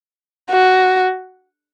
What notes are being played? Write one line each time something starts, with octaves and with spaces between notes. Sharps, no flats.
F#4